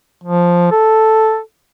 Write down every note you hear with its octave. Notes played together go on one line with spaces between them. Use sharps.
F3
A4